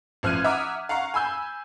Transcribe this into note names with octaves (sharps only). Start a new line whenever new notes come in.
A1 F3 F6 F#6 G#6 D#7
E5 F#5 A#5 D6 D#6 F6
F5 F#5 A#5 C#6 C7
G#5 B5 E6 G6